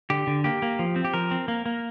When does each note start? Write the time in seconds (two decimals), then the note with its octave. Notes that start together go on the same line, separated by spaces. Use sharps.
0.10 D3 G4
0.27 D3
0.44 A#3 G4
0.62 A#3
0.79 F3
0.96 C4
1.05 G4
1.14 F3 A#4
1.31 C4
1.48 A#3
1.66 A#3